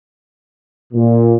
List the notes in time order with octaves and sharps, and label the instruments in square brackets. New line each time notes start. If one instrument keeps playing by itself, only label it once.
[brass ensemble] A#2